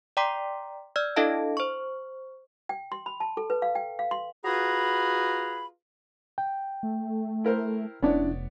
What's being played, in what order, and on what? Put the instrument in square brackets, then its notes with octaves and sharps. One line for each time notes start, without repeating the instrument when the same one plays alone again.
[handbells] D5 G5 A#5 C6 D6 B6
D5 E6 F6 G#6
D4 E4 A4 D#5 F5 A5
C5 C#6
[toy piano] G5
C6
B5
A5
A4
B4
F5
G5
F5
C6
[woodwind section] F4 F#4 G#4 B4 A#5 B5
[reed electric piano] G5
[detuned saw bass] A3
[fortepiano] E4 A#4 C5
[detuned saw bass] F1 [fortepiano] B3 C#5 D5 [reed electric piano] C#4 D4 E4